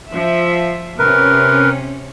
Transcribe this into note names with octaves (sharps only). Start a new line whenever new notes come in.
F3 E5
C3 C#4 A#4 B4